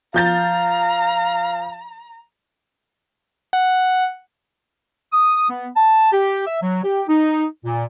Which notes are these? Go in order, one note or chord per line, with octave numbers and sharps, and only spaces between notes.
F3 F5 A#5 G6 A6
F#5
D#6
B3
A5
G4
E5
F#3
G4
D#4
A#2